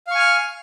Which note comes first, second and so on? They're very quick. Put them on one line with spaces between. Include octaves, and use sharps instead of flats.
F5 C#6 G#5 F6